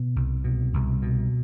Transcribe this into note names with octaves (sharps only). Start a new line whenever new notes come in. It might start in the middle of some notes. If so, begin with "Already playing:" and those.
Already playing: B2
C2
B2
C2
B2